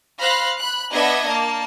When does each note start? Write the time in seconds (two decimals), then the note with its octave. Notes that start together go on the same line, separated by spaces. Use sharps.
0.20 C5 F5 B5 F#6 A#6
0.59 B5 F#6
0.93 B3 D4 D#5 E5 G#6 A#6
1.28 A#3 A5